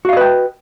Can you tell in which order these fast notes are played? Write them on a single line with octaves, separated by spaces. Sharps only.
F#4 F5 D#5 B4 G5